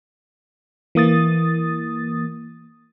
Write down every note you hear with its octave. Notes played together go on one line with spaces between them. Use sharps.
E3 A#3 D#6 A6